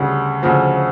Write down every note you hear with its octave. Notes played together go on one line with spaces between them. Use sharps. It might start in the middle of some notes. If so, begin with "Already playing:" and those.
Already playing: D2 C#3 G3
D2 C#3 F3